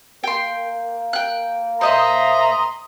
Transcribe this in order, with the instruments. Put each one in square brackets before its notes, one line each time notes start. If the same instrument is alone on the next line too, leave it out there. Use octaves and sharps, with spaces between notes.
[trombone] A#3 [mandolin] G5 C6
[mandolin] G5 F#6
[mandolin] C5 D#5 E5 [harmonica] A#5 C6 [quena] D#6